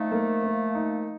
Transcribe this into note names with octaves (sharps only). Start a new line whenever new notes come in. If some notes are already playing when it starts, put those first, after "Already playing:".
Already playing: F3 A3 D#4
A#3
A#3
D#4